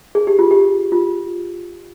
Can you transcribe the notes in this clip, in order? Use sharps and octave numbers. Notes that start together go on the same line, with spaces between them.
G#4
G4
F4
G4
F4